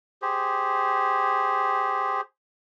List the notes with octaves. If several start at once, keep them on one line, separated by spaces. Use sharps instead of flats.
G4 G#4 C5